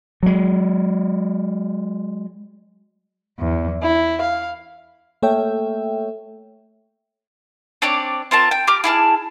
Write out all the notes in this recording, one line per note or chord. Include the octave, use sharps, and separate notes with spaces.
F#3 G#3
E2
E4
F5
A3 A#3 A4 C#5 E5 G5
C4 D4 C#5 D5
C4 F4 A#4 A5
G5
G4 A#5 D6 F6
E4 G#4 A5 F6